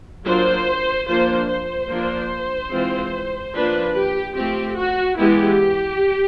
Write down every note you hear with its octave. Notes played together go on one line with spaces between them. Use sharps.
F#3 A#3 D4 F4 C5
F3 A#3 D4 F4 C5
C5
F3 A#3 D4 F4
E3 G#3 C4 F4
F3 A#3 D4 F4 B4
G4
F3 A3 C4 G4
F#4
E3 G#3 B3 E4 G4